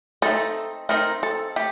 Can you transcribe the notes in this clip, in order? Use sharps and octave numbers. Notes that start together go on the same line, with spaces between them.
A3 C4 D#4 A4
A3 C4 D#4 A#4
A4
A3 G4